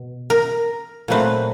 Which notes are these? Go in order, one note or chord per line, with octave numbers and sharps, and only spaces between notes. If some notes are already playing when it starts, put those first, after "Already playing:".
Already playing: B2
A#4
A#2 F#3 A3 C4 B4